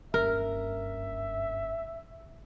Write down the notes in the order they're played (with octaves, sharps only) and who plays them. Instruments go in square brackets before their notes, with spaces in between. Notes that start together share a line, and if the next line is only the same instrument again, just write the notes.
[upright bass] F#1 G2 [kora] A#4 [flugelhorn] E5